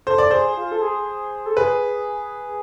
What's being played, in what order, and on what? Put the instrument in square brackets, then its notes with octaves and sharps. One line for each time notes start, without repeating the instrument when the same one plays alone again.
[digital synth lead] A4 [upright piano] C5
[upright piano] D5
[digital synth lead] G#4 [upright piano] C5
[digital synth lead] F4
A4
G#4
A4
[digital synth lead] G#4 [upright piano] B4